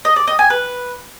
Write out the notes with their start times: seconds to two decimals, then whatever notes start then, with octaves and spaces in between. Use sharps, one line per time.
0.05 D#5
0.16 D5
0.28 D#5
0.39 G#5
0.50 B4